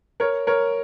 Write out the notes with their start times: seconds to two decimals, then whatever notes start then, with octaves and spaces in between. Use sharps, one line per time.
0.20 A#4 C#5
0.47 A#4 C#5